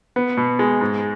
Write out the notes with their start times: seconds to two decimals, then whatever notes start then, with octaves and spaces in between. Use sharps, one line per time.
0.16 B3
0.37 B2
0.59 G#3
0.81 G#2